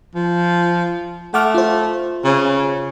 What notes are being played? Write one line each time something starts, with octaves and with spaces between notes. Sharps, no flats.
F3
A3 F#5 D6 F6
F4 C5
C#3